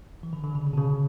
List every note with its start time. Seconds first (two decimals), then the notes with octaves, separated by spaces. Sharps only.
0.23 E3
0.33 D3
0.44 D3
0.55 C#3
0.66 C#3
0.73 B2
0.77 C#3